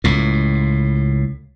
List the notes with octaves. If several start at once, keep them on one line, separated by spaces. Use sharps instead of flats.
C#2 A2